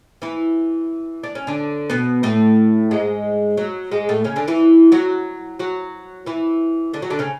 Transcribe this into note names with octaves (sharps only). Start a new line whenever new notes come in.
E3 E4
D4
C#4
D3 D4
B2 B3
A2 A3
G#2 G#3
F#3
G#2 G#3
A2 A3
C#3 C#4
D3 D4
E3 E4
F#3 F#4
F#3 F#4
E3 E4
D3 D4
F#3 F#4
D3 D4
C#3 C#4